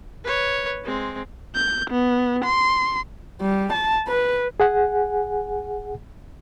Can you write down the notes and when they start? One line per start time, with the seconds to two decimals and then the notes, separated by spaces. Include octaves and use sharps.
0.24 B4 C#5
0.84 G#3 C4
1.56 G6
1.90 B3
2.44 C6
3.41 G3
3.73 A5
4.08 B4
4.60 G#4 F#5 G#5